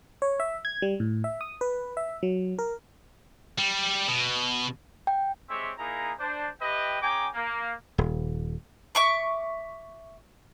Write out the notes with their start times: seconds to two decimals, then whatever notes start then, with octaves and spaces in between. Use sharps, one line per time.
0.22 C#5
0.40 E5
0.65 G#6
0.82 G3
1.00 A2
1.24 E5
1.41 D#6
1.61 B4
1.97 E5
2.23 F#3
2.59 A#4
3.58 G3
4.08 B2
5.07 G5
5.49 G#3 C4 G4 C#5 E5
5.78 A#3 D#4 E4 G#4 A#5
6.19 D4 C5
6.61 E4 G4 B4 D#5 G5
7.02 C#4 G#4 G5 G#5 A#5 D6
7.34 A#3
7.98 D#1
8.95 E5 C#6 D6